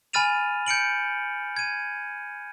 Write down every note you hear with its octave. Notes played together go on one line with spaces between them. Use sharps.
G#5 B5 F6 A6 D#7 F7
G6 C#7 D7 F#7
G#6 D#7